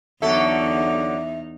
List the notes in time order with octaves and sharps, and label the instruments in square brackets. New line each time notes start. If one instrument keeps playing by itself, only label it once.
[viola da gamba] E2 D#4 [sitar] D3 F#3 A4 [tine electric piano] E5